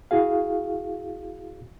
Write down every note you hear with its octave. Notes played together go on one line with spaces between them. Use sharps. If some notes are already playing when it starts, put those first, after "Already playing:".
E4 F#4 G#4 F5